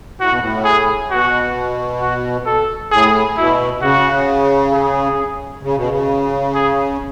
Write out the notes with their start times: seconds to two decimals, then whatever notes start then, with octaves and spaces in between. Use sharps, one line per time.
0.20 A2 F#4
0.30 B2
0.38 A2
0.65 G#4
1.10 B2 F#4
2.01 F#4
2.46 A4
2.91 A2 G#4
3.37 B2 E4
3.82 C#3 F#4
4.73 G#4
5.63 C#3
5.76 B2
5.89 C#3
6.54 G#4